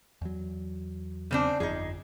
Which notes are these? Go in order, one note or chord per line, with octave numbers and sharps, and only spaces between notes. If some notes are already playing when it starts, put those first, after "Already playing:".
E2 F#3
C#3 C4 D4
G1 F2 F3 D#4 G#4